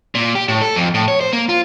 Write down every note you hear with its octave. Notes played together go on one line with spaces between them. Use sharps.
A#2
G4
A2
A4
F2
A2
C#5
C5
A#3
F4